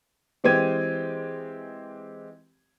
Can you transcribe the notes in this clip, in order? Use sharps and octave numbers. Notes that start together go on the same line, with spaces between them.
E3 G#3 C4 G4 G#6 D#7